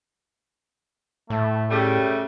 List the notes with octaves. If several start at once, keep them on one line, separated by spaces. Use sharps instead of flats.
A2 A3
C#3 G3 A3 G4